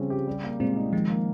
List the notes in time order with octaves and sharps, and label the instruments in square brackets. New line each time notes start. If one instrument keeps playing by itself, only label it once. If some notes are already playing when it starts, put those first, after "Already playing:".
Already playing: [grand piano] C#3 F3 C4 C#4 [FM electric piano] G3
[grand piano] G4
G3
A#3
[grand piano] A#2 [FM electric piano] G#3 C4
[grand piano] D#4
[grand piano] D#3 [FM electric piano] F3 G#3
[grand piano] A#3